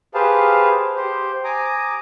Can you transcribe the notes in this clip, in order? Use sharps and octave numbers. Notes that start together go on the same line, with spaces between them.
G4 G#4 B4 C5 F5 A5
G4 C5
G#5 A#5 D6 D#6